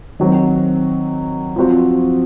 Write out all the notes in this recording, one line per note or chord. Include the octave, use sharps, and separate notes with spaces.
D#3 F#3 C4
F3 C4 F#4